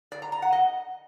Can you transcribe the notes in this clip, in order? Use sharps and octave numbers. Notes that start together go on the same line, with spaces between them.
D5
A#5
A#5
F#5
D#5